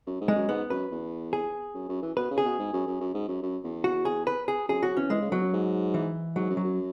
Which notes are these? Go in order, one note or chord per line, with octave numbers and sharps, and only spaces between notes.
F#2
G#2
G#3
F#2
G#2 B3
F#2 B4
E2
G#4
F#2
F#2
E3
B2 B4
C#3
G#4
B2
G#2
F#2
F#2
F#2
G#2
F#2
F#2
E2
F#4
G#4
B4
G#4
F#2 G#4
F#3 F#4
E3 C#4
E3 G#3
C#3
B2 F#3
F#2
G#2
E3
G#2 F#3
F#2
F#3
F#2